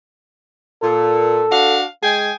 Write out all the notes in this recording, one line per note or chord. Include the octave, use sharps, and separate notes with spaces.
A#2 A4
D4 F#4 F5
G#3 G#4 G5 G#5